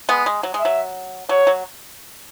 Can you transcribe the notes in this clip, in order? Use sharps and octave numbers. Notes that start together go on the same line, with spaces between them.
G#3 B3
G#3
F#3
G#3
F#3 E5
F#3 C#5
F#3